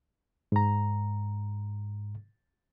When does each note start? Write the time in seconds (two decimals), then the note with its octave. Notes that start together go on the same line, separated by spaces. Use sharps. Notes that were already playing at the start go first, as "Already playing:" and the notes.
0.52 G#2 A#5